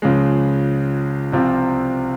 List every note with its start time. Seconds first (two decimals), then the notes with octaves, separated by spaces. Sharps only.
0.02 C#2 C#3 F3 G#3
1.32 C2 C3 F3 C4 F4